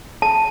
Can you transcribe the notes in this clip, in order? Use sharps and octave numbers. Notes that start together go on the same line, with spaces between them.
A5